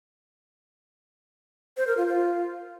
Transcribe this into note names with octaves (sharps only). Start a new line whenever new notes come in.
C5
A#4
F4
F4